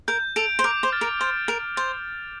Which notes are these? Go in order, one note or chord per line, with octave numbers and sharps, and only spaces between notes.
A#4 G6
A4 D7 F7
C5
A#4 D6
C5
F6 A6
A#4
C5 D6
A#4 A6 D7 F7
C5 A6